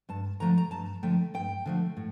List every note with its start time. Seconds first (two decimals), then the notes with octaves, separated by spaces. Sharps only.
0.09 G2 A5
0.40 D3 F3 A3 A#5
0.58 A#5
0.71 G2 A5
1.03 D3 F3 A3 G5
1.34 G2 G5
1.66 D3 F3 A3
1.97 A2